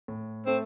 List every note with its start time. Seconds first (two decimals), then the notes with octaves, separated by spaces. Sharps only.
0.08 A2
0.46 A3 C4